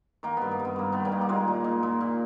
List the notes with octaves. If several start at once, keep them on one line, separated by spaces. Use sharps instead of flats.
D#3 A#3
G2 B3
A#3
G2
B3
G2 A#3
D#3 B3
G3 A#3
D#3
A#3
A#2 G#3
A#2
A#2
A#2
A#2